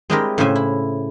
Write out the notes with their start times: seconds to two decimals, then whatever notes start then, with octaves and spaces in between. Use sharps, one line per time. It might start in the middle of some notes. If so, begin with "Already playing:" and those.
0.10 G#3 C4 D4 E4 G4 A#4
0.38 A2 C#3 C#4 C5 E5 G#5
0.56 E4